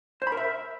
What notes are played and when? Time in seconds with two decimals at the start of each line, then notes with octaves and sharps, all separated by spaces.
0.22 C5
0.27 B5
0.32 A#4
0.37 E5